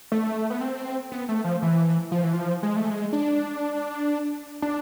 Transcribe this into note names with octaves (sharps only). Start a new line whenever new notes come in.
A3
B3
C4
B3
A3
F3
E3
F3
E3
F3
G#3
A3
G#3
D4
D4